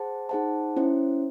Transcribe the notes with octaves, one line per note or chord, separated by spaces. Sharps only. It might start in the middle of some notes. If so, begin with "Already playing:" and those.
Already playing: G#4 C5 F#5 A5
D#4 G#4 C5 F#5 A5
C#4 E4 C5